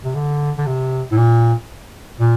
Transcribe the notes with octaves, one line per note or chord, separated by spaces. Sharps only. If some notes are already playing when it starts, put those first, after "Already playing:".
C3
D3
D3
C3
A2
A#2
A#2